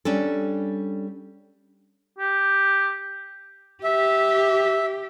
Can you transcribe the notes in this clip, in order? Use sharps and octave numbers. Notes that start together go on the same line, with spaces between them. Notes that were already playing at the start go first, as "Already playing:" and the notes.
G3 C#4 D4 A4
G4
G4 E5